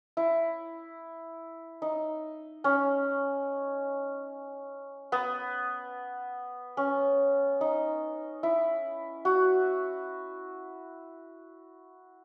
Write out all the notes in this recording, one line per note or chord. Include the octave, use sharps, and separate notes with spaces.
E4
D#4
C#4
B3
C#4
D#4
E4
F#4